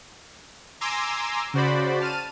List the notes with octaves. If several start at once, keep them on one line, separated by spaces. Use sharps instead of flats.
G#5 A#5 C6 D6 E6
C#3 F#4 C5 D5 B5
A5 F6 D#7